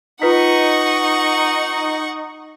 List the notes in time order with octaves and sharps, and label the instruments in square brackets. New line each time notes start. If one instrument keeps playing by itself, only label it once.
[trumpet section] D#4 [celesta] F4 B4 B6 [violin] F#5 C#6